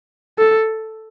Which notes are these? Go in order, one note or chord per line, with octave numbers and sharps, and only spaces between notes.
A4